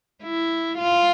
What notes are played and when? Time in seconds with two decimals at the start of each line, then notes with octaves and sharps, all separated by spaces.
0.23 E4
0.78 F4